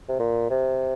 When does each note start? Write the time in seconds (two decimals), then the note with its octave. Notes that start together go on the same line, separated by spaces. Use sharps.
0.09 C3
0.20 A#2
0.50 C3